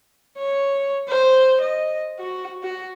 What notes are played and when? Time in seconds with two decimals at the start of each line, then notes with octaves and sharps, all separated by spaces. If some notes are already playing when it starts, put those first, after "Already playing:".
0.38 C#5
1.08 C5
1.61 D#5
2.20 F#4
2.63 F#4